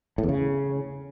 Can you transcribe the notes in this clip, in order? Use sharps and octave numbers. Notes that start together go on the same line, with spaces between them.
A2
E2
C#3